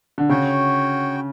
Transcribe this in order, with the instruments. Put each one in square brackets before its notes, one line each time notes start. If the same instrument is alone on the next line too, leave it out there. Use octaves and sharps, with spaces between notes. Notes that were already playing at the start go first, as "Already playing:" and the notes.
[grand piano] D3
[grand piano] C#3 [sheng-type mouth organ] F#4 C#5 G5